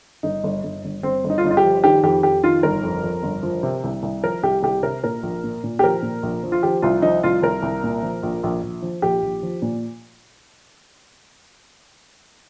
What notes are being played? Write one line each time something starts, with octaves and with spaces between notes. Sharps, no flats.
G1 D#4
G1
G1
G1
G1 C4
G1
D#4
F4
G1 D#4
F4
G4
F3
D#3 G4
F2 G4
F2 G4
D#3 F4
G1 A#4
F2
F2
G1
F3
C3
C2
C2
F3 A#4
C2 G4
C2 G4
C3 A#4
A#2 A#4
A#1
A#2
A#2
G4
F3 A#4
A#2
A#1
F3
F4
F3 G4
C2 F4
F3 D#4
C2 F4
C2 A#4
C2
A#2
F3
A#1
A#1
A#1
F3
A#1 G4
A#1
F3
A#2